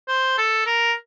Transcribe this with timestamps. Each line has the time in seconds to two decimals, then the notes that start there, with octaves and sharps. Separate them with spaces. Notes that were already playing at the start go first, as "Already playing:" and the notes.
0.08 C5
0.38 A4
0.66 A#4